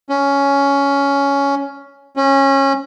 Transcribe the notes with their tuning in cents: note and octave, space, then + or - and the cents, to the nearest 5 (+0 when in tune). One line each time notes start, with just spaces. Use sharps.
C#4 +10
C#4 -20